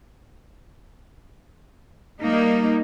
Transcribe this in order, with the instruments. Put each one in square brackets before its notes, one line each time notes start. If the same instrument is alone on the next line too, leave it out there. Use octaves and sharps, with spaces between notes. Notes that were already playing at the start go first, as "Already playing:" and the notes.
[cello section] G3 A#3 D#4